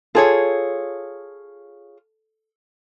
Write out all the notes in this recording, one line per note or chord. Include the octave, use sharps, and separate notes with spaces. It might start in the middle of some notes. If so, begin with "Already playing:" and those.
F4 G#4 A4 C#5